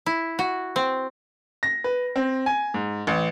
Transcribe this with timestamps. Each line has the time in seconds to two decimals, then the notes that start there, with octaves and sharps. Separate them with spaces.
0.06 E4
0.39 F#4
0.76 C4
1.63 A#6
1.84 B4
2.16 C4
2.46 G#5
2.74 G#2
3.07 A1